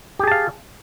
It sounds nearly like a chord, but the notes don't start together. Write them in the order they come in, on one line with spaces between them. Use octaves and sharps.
G4 G#4 A5 F5